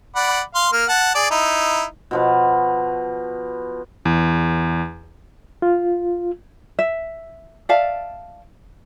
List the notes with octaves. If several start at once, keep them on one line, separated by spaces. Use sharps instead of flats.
D5 F#5 B5
F5 C6
A#3 F6
F#5 A5
G#4 D5
D#4 E4
B2 F3 B4
E2
F4
E5
D5 E5 F5 A5